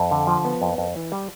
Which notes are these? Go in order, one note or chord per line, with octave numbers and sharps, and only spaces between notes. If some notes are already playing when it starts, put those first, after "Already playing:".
Already playing: F2
D3
F3
B3
F2
F2
E3
G3